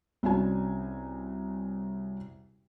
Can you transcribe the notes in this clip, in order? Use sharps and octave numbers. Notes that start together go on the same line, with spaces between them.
C2 C#4 F#4 G#5